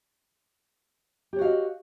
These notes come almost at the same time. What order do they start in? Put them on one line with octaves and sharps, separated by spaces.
G4 C#5 F#4 F5 D#5